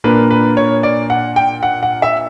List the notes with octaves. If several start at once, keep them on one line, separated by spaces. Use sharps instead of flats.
A#2 A#3 D4 B4
B4
C#5
D5
F#5
G5
F#5
F#5
E5